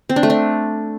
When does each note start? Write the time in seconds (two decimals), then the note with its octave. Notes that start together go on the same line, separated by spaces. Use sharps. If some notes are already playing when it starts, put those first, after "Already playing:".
0.09 C4
0.16 D4
0.23 A3
0.30 D4